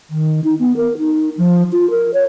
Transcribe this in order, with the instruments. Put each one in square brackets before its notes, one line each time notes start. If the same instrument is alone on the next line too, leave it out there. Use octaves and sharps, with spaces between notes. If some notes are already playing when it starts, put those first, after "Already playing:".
[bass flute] D#3
D#4
B3
A#4
D#4
F3
F4
A#4
C#5